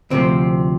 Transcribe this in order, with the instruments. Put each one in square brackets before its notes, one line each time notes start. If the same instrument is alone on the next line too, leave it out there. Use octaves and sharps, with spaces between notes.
[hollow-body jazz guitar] D2 C3 F3 C4